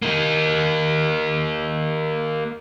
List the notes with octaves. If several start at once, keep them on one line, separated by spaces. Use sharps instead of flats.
A#3 D#4